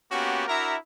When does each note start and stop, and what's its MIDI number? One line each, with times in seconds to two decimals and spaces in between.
0.12 0.44 58
0.12 0.44 59
0.12 0.44 61
0.12 0.44 66
0.12 0.44 67
0.48 0.76 62
0.48 0.76 64
0.48 0.76 66
0.48 0.76 70
0.48 0.76 76
0.48 0.76 82